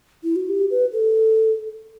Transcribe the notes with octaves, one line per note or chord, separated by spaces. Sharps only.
E4
F#4
G4
B4
A4